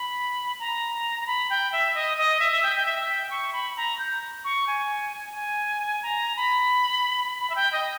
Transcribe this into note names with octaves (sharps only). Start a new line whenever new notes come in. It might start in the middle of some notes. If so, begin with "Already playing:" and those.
Already playing: B5
A#5
A#5
B5
G5
E5
D#5
D#5
E5
E5
G5
G5
E5
G5
C#6
B5
A#5
G6
C#6
G#5
G#5
A#5
B5
B5
E5
G5
D#5